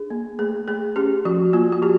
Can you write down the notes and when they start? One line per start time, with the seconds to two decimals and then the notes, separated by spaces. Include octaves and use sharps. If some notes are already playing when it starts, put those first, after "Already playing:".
Already playing: D4 G#4
0.10 A#3
0.39 A3 G#4
0.68 A3 G#4
0.96 C#4 G4
1.25 F3 F#4
1.53 A#3 F4
1.72 F#4
1.82 F3 G4